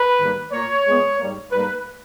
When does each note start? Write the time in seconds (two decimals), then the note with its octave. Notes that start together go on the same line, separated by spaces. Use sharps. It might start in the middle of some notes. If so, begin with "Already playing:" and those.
Already playing: B4
0.18 G#2 D#3 G3 A#3
0.52 A#2 A#3 C#5
0.85 A#2 G#3 B3
1.18 G#2 G3 A#3
1.52 G#2 G3 A#3 B4